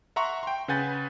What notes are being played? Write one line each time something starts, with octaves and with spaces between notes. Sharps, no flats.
E5 F#5 A#5 C6 C#6
G5 C6
C#3 B4 F#5 G#5 G6 A6